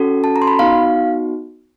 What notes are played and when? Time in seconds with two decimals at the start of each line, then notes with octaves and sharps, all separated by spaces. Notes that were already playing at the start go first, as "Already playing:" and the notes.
Already playing: C#4 F#4 A4
0.24 A5
0.36 A#5
0.42 C6
0.47 B5
0.59 B3 D#4 F#4 F5